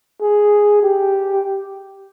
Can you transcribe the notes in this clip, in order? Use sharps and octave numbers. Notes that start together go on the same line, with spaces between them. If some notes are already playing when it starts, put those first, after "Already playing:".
G#4
G4